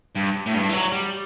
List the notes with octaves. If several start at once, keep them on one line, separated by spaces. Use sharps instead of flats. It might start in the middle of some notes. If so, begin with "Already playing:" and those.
G2
A2
G2
E3
F#3
G3